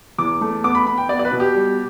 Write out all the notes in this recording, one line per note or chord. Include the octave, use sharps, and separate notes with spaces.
E2 D6
A3
B3 D6
B5
B3 B5
G5
B3 D5
D5
B4
B2
G4
G3